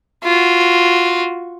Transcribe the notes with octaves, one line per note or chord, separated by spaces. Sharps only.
F4 F#4